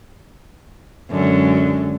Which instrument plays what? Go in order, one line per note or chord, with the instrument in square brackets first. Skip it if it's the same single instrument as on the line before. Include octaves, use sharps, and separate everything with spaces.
[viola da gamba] F#2 [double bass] D3 G#3